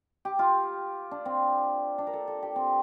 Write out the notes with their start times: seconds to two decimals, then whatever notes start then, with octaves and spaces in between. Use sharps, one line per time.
0.25 G4
0.39 F4
1.11 D4
1.25 C4
1.98 D4
2.07 A#4
2.13 A4
2.28 A4
2.42 G4
2.56 C4